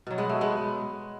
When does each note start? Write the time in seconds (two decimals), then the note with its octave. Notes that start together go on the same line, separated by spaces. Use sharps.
0.07 B2 F#3
0.18 G#3 B3
0.29 A3
0.41 G#3 B3